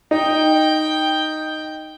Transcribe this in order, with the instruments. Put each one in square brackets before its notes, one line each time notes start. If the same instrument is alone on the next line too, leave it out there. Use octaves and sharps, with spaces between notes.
[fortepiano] D#4 [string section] G5